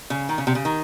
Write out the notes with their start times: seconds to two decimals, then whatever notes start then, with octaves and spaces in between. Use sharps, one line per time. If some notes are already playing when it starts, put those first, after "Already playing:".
0.10 C#3
0.29 D#3
0.38 C#3
0.47 C3
0.55 C#3
0.65 D#3